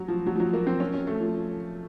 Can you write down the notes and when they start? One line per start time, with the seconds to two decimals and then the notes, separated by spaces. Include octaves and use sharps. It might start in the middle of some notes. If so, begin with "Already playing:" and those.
Already playing: F#3
0.08 F3
0.27 F#3
0.36 F3
0.40 F#3
0.53 A#3
0.67 C4
0.80 C#4
0.93 C#4
1.07 A3
1.20 F3